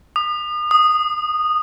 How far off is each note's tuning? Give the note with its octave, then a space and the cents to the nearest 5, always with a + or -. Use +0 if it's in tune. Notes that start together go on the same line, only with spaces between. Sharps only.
D#6 -40
D#6 -15